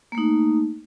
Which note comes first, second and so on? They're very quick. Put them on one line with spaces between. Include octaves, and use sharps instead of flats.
A#3 A3 D#4